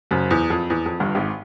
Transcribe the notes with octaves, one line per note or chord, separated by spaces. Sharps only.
F#1 F#2
E2
F2
E2
F2
G1 G2
G#1 G#2